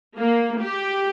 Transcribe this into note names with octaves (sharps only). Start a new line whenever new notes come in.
A#3
G4